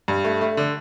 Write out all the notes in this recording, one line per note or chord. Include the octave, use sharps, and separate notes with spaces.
G2
A3
A3
D3